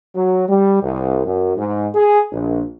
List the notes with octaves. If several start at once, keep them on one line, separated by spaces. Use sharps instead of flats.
F#3
G3
C2
F#2
G#2
G#4
A#1